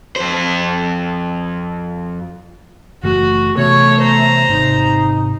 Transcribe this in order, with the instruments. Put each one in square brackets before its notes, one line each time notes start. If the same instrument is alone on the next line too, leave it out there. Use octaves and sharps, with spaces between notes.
[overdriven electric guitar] F2 C5
[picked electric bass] F#1 E3 A3 [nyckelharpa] F#4
[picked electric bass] C3 E3 B3 [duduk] A3 [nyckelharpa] C#5
[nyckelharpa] C5 A#5
[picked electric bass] G#1 C3 [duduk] D#4